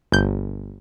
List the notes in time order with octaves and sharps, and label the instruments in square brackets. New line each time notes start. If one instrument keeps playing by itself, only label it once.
[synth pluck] G1 G6